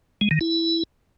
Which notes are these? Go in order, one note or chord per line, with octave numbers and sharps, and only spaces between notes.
G#3
D#3
E4